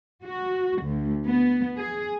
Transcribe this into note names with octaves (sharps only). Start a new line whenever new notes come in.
F#4
D2
B3
G#4